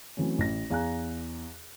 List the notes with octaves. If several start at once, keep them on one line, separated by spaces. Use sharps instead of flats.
E3 F#3 A3 C4 C#4
A1 A#6
E2 F5 G#5 A#5 F#6